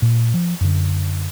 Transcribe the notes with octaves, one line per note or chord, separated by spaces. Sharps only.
A#2
F3
F#2 D3